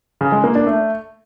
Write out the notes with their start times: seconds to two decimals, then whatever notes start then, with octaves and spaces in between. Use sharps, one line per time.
0.21 C#3
0.32 G#3
0.44 A#3
0.55 D4
0.67 A3